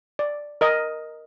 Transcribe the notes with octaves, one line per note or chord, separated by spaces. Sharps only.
D5
A#4 D#5